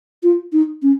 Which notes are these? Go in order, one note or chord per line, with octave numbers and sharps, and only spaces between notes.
F4
D#4
C#4